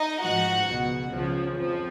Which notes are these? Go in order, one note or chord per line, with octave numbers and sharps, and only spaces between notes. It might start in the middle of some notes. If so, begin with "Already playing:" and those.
Already playing: D#4 D#5
G#2 F3 F#4 F#5
C#2 B2
C#2 C#3 F3
F2 F3